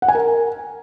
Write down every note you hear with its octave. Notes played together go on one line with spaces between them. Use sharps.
F#5
G#5
A#4